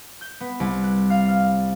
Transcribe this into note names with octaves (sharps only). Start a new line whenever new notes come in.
G6
B3
C2
F#6
F5
F6